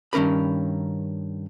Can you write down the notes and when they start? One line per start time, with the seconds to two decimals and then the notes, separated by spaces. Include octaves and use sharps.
0.13 G2 D#3 C#4 A#4 B5